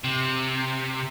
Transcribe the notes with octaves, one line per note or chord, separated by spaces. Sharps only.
C3